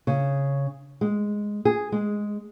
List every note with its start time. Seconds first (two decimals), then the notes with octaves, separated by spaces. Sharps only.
0.07 C#3
1.01 G#3
1.65 G#4
1.92 G#3